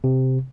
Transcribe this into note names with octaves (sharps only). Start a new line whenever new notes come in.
C3